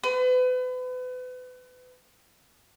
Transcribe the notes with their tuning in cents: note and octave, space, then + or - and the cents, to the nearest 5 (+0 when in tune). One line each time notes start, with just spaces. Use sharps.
B4 +35